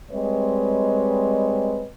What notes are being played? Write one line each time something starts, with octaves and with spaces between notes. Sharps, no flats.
G3 G#3 C4 B4 C#5 D#5